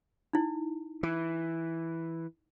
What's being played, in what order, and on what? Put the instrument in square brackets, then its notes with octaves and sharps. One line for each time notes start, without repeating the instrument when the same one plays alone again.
[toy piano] D#4 E4
[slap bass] E3